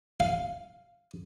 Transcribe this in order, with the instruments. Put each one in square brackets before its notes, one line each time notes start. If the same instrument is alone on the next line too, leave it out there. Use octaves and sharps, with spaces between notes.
[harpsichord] F5